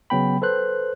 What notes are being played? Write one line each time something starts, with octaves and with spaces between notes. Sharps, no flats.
C#3 F#3 B3 G5 B5
A4 B4 C5 F#6